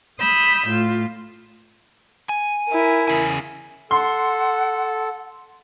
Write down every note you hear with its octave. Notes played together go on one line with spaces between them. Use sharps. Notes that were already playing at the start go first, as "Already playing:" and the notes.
B5 D#6 E6 G6
A2 F4
G#5
E4 A#4
E2 C#3 G#5
A4 F#5 C6